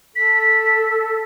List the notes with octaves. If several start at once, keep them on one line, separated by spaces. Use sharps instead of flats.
A4 B6